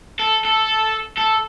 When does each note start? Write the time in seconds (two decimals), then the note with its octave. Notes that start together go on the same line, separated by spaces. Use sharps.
0.20 A4
0.45 A4
1.17 A4